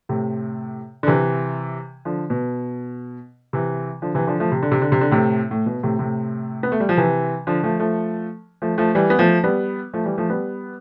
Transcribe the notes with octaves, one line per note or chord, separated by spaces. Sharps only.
A2 C3
D3
C3 E3
D3 F3
B2
C3 E3
D3 F3
C3 E3
D3 F3
F3 A3
C3
D3
C3
D3
C3
D3
A2 C3
A2
B2
A2 C3
A2 C3
B3
A3
G3
F3
C3 E3
D3 F3
F3 A3
F3 A3
F3 A3
F3 A3
E3 G3
B3
F3 A3
G3 B3
F3 A3
E3 G3
F3 A3
G3 B3